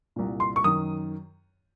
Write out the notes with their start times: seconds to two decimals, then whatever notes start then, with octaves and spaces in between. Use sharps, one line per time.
0.16 C2 A#2
0.40 C6
0.56 C#6
0.64 F#2 D#3 D#6